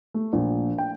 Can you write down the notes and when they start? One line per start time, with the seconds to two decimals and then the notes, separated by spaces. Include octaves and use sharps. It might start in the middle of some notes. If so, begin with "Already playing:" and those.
0.14 A3
0.33 A#1
0.78 G5